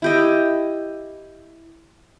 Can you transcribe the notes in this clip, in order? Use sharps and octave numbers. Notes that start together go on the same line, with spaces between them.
E4 G4 D#5